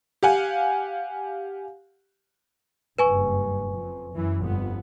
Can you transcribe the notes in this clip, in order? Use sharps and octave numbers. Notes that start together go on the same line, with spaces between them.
G4 F5 F#5 G#5
F#1 G2 B4 G#5 C#6
F2
F#2 E3
G1 F2 B3